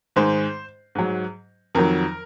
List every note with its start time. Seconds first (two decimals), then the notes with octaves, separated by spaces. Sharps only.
0.16 G#2 D#3 G#3 C5
0.95 G#2 F#3
1.75 F2 D#3 F#3 A#4